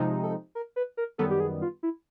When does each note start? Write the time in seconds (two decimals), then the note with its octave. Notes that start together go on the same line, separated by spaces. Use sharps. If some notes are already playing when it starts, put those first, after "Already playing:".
Already playing: C3 F3 G#3 C4 D#4
0.23 A4
0.55 A#4
0.76 B4
0.97 A#4
1.18 F#2 D#3 G3 B3 A4
1.30 G4
1.40 G#4
1.62 F4
1.83 E4